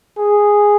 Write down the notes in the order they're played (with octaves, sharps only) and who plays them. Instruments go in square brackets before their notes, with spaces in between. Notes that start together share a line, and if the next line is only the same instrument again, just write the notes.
[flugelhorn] G#4